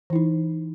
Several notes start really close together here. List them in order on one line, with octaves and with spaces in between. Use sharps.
E3 E4 D#4